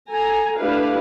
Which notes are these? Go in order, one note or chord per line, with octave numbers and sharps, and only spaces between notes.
A4 G#5 A#5
A3 D4 E4 G4 B4 F5